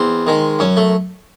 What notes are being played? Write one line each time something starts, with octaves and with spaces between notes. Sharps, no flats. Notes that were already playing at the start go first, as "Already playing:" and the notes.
Already playing: E2 C4
D#3 G#3
F#2 C#4
A3